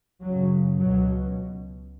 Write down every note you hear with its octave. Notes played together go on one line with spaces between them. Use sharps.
F#2 C#3 F#3
C#2 B2 F#3